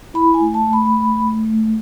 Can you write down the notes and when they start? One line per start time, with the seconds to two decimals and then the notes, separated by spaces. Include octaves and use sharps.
0.14 E4 B5
0.34 G#5
0.40 A3
0.54 A5
0.67 A3
0.73 B5
0.93 A3
1.19 A3
1.46 A3